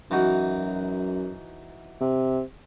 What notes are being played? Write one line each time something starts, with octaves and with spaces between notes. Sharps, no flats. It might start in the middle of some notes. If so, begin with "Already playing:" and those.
F#2 E3 D#4 F#4
C3